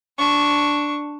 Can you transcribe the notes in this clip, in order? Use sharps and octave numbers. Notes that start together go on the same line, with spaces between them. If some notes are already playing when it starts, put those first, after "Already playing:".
D4 C#6